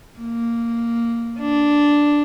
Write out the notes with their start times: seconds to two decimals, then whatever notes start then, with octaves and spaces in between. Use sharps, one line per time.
0.19 A#3
1.40 D4